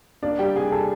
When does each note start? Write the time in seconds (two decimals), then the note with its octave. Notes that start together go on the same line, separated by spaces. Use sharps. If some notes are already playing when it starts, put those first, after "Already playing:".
0.23 A#3 D4 D5
0.39 G3 G4 G5
0.56 C3 G#4 G#5
0.72 G3 A4 A5